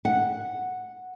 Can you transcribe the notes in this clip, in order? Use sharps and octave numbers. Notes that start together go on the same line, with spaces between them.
F#5